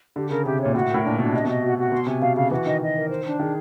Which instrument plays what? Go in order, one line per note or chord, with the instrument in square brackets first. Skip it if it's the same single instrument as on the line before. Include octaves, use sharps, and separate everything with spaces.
[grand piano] D3 [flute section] G4
[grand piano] C#3 [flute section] A#4
[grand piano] C3 [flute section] G4
[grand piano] A#2 [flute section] C#5
[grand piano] A2 [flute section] F#4
[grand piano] A2 [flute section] A#4
[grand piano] A#2 [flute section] D4
[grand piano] B2 [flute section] D4
[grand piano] C3 [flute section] D#5
[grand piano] B2 [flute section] D#5
[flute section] F#4
F#4
[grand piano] B2 [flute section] C6
[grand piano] C3 [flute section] G#5
[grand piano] B2 [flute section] F5
[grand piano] C#3 [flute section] F5
[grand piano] E3 [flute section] F#4
[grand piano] D#3 [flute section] D#5
[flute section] D#5
A#4
C5
D4
[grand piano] D#3 [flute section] G#4